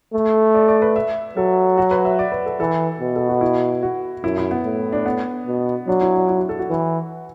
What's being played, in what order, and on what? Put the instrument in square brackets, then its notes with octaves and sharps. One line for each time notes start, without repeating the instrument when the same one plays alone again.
[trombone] A3
[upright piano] D5
D5
B4
E5
[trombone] F#3 [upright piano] A4
[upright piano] F#4
B4
E5
D5
B4
A4
[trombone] E3 [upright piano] A4
[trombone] B2
[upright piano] A4
F#4
E4
F#4
[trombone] F#2 [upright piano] E4
[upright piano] E4
B3
[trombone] A2
[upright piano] D4
B3
[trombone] B2
[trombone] F#3 [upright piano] D4
[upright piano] E4
D4
E4
F#4
A4
F#4
[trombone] E3